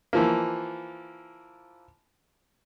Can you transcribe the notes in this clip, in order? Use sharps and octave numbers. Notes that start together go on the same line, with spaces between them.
E3 F3 A#3